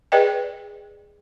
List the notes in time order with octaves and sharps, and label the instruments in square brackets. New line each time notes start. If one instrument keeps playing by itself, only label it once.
[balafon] G#4 B4 D5 D#5 G5